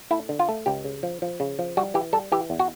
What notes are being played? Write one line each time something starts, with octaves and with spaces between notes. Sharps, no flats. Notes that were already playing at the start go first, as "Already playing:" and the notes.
A3 E4
D3
F4
A3
C#2 G4
C#3
F3
F3
C#3
F3
G3 F#4
E3 G4
G3 A4
E3 G4
E2
F#4